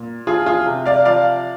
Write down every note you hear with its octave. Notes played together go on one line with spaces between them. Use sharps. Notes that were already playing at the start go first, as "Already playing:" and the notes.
Already playing: A#2
F3 F4 G#4
F4 G#4
C3
D5 F5
F3 D5 F5